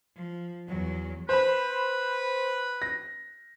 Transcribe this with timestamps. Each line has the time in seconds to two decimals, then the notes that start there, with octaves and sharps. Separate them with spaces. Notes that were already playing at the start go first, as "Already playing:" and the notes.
0.17 F3
0.68 E2 F#3
1.29 B4 C5 B5
2.82 A#6